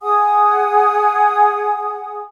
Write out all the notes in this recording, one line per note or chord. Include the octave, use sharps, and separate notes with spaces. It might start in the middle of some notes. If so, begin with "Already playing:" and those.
G#4 F#5 G#5 D#6